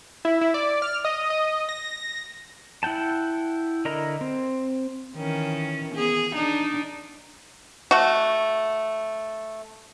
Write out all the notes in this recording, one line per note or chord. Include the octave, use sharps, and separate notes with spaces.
E4
E4
D5
F6
D#5
D#5
A#6
E4 F#5 G5 A5
D3 E4 A#4 D#5 A#5
C4
D#3 E3 C#4
B3 G#4
D4 D#4
A3 F#4